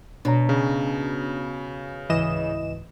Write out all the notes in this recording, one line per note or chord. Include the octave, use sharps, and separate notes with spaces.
B2 D4 C#5 A#5
C#3
C#2 G#2 E3 D#5 E7